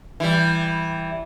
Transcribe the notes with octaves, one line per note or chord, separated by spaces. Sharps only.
E3 G3